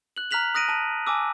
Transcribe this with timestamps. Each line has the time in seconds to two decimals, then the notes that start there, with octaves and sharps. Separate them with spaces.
0.16 F#6 F#7
0.31 A#5 F6 F#6 B6 F7 F#7
0.55 D#6 F#6 A#6 D7 D#7
0.69 A5 D#7
1.07 G#5 A5 D6 E6